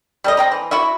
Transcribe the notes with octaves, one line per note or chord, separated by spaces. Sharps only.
G3 A4 D#5
C4 G5 A#5
E3
E4 F#4 E5